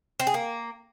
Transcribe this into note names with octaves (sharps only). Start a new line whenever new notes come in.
C4
G#4
A#3